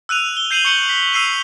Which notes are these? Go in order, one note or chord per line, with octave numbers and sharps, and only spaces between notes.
E6 F#6 D#7 F7
G7
G6 C7 D#7 F7 F#7
C#6 G6 C#7 D#7 F#7 G7
B6
E6 C7 D#7 F7 F#7